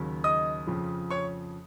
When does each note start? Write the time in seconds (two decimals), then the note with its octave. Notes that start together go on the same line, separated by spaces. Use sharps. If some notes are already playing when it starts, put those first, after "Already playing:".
Already playing: D#2 C#3 F#3
0.24 D#5 D#6
0.67 F2 C#3 F3
1.10 C#5 C#6